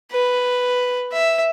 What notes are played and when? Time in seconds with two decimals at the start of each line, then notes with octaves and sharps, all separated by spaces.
0.11 B4
1.12 E5